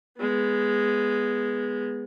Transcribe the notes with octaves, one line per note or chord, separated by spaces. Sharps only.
G#3 B3